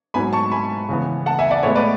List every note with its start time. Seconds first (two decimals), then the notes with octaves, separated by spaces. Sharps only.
0.14 G#2 F#3 B3 G#5 B5
0.33 A5 C#6
0.52 G#5 B5
0.89 C#3 E3 B3
1.26 F#5 A5
1.39 E5 G#5
1.51 D5 F#5
1.63 A2 G#3 B3 C#5 E5
1.75 B4 D5